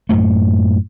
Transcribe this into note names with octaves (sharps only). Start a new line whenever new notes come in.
F#2 A2 A3